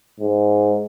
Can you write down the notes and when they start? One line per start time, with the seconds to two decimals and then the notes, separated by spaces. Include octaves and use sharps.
0.20 G#2